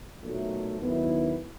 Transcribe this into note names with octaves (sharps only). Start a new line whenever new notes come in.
B1 A#2 F#3 A3
D#2 D#3 F#3 B3 E4